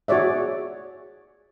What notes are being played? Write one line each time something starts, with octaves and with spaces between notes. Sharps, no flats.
F#4 G#4 C#5 D5 E5